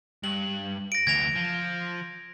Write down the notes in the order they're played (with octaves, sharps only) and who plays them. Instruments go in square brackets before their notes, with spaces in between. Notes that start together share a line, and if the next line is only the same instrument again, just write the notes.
[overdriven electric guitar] G2 [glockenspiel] F#7
[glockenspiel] A#6 D7
[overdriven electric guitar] D2 E3 [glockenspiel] G#6 A#6 F7
[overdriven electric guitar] F3